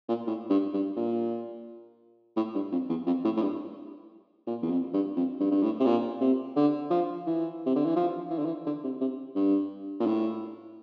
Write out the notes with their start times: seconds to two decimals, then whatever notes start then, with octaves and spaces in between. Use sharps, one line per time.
0.09 A#2
0.27 A2
0.50 G2
0.73 G2
0.96 A#2
2.36 A2
2.54 G2
2.72 F2
2.89 E2
3.06 F2
3.24 A2
3.36 A2
3.42 G2
4.47 A#2
4.62 E2
4.70 F2
4.93 G2
5.16 F2
5.40 G2
5.51 G2
5.63 A2
5.80 C3
5.86 A#2
6.21 C3
6.56 D3
6.90 F3
7.26 E3
7.66 C3
7.76 D3
7.85 E3
7.96 F3
8.30 E3
8.38 D3
8.45 E3
8.66 D3
8.84 C3
9.00 C3
9.35 G2
10.00 A#2
10.06 A2